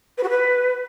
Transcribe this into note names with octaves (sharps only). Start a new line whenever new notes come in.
B4
F#4
B4